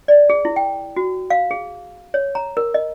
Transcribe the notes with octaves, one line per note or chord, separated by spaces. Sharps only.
D5
G#4
E4
G5
F#4
F5
G#4
C#5
A#5
A#4
D#5